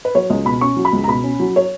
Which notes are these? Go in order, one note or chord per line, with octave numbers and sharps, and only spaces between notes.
B4
F#3 C#5
C#2 D#5
B2 B5
C#4 C#6
F#3
B5
C#2
A#5
B2 B5
C#4
F#3
C#5